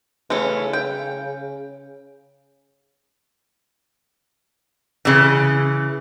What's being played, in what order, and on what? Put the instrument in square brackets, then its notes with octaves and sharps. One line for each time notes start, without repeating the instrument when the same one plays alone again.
[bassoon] C#3 [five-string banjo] E3 A3 C#4
[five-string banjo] G5
[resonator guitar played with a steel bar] C#3 E3